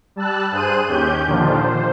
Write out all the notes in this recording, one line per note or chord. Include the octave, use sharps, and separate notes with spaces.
G3 A5 E6 F#6
G2 G#4 C5 F#6 D#7
D#2 C#4 G4 G6
A#2 D3 D#3 F3 D4 F4
C5